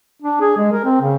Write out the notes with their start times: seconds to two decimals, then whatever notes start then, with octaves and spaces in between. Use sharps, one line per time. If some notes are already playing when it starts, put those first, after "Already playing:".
0.22 D4
0.41 G#4
0.57 G#3
0.73 A#4
0.85 C4
1.01 C#3